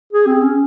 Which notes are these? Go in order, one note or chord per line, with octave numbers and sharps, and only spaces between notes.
G#4
C4
C#4